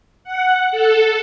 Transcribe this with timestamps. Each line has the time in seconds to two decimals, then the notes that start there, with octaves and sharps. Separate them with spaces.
0.24 F#5
0.71 A4